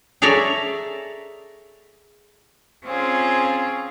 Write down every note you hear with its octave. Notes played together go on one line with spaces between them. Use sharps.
G#4 A4 C#5 D5 E5 A#5
C4 C#4 F4 G#4